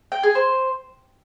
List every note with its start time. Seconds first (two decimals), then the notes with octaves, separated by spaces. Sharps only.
0.12 G5
0.23 G#4
0.35 C5